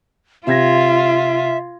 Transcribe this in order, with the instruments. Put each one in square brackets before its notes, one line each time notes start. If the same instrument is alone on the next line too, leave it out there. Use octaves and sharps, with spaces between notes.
[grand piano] C3 G#6 A#6 [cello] F4 [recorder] E5